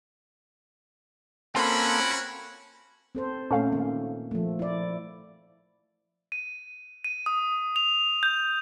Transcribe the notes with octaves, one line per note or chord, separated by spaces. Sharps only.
A#3 C4 C#4 F4 F#4 A4 B5
C4 A4 C5
A#2 A3 C#4 A4 F5
D#3 A#3
F3 A3
E4 D5
D#7
D#7
D#6
F7
G6